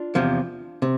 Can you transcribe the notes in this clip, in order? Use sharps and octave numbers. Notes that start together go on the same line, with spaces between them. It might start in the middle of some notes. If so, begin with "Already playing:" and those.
Already playing: D4 F4
E2 C3 F3
C3